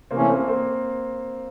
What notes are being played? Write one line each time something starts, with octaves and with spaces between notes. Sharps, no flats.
C3 E3 A3 A#3 C4 C#4
A#3 C4
A#3 C4